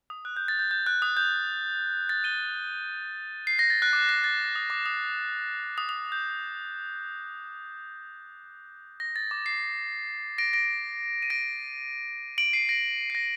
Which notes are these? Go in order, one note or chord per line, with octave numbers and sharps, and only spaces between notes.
D#6
F#6
G6
A6
G6
G6
F#6
D#6
G6
A6
D#7 G7
C7
A#6
A6
F#6
D6
A#6
A6
D#6
D6
D#6
D#6
D#6
G6
A#6
A6
D6
C7
A#6 D7
A#6 D7
D#7
A#6 D7
D7 F#7
C7 D#7
A#6 D7
C7
A#6